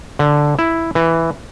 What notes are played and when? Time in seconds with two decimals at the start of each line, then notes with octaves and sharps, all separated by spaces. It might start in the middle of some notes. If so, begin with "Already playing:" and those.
0.19 D3
0.59 E4
0.95 E3